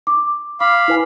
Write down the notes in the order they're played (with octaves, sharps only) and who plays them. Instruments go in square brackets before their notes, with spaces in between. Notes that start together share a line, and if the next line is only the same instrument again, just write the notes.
[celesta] D6
[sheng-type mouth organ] F5 B5 [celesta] D6
[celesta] E4 B4 G#5